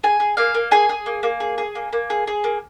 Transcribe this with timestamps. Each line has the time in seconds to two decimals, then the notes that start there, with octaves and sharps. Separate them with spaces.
0.04 G#4 G#5
0.20 G#4
0.37 A#3 F5
0.54 A#3
0.71 G#4 G#5
0.89 G#4
1.06 A#3
1.23 A#3
1.40 G#4
1.58 G#4
1.75 A#3
1.93 A#3
2.10 G#4
2.27 G#4
2.44 A#3